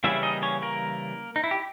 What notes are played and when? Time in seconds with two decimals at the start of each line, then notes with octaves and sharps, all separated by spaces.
0.04 C#3 E3 G3 A#3 C#4 E4 E5
0.23 D#4 D#5
0.42 C#4 C#5
0.62 A#3 A#4
1.36 D#4
1.44 E4
1.51 G4